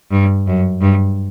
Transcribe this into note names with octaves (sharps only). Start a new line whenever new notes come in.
G2
F#2
G2